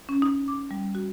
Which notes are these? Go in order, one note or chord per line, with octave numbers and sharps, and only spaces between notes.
C#4
D#4
D6
G3
F#4